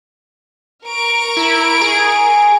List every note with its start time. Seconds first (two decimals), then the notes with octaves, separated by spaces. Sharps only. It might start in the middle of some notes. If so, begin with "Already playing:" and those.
0.86 A#4 C#6 D7
1.37 E4
1.82 G#4